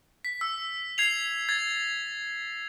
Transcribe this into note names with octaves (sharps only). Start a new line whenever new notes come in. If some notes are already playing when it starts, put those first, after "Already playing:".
B6
E6
G#6 C7 F7
G#6 A6